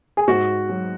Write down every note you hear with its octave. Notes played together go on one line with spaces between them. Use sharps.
G#4
G#2 F#4
F#3